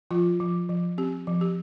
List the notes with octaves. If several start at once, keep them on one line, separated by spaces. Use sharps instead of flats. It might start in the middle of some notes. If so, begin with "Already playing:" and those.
F3 F4
F3
F3
C4 G4
F3
G4